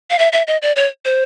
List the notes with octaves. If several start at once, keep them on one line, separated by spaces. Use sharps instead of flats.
F5
E5
E5
D#5
D5
C#5
C5